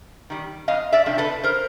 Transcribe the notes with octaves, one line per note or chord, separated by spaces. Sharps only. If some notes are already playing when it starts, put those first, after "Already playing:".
D#3 G3
F2 D#5 F5
D5 E5
C3 F3 A3 D4
A4 B4
A#4 C5